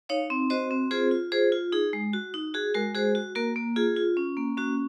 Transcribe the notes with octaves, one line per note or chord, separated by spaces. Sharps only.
D#4 C#5 F5
C4
F#4 C5 D#5
C4
F4 G#4 C5
F4
F4 G#4 C5
F4
D#4 G#4
G#3
F#4
D#4
F#4 G#4
G#3 F#4 A#4
F#4 G#4 C5
F#4
A#3 F#4 A#4
A#3
F4 G#4
F4
C#4
A#3
C#4 F#4